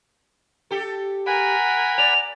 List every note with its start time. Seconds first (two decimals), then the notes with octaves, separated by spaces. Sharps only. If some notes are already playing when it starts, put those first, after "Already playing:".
0.71 G4 A4
1.27 A#4 F#5 G#5 B5
1.98 D5 F7